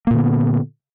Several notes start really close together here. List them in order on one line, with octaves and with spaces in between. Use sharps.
A#3 A#2 D3 B3